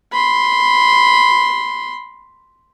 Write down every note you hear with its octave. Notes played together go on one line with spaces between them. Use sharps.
B5 C6